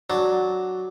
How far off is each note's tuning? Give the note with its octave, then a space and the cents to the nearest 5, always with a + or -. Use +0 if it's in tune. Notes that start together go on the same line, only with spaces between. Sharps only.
F#3 +0 D4 +0